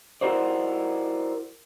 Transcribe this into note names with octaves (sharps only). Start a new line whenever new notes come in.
E4 F#4 A#4 C5 D5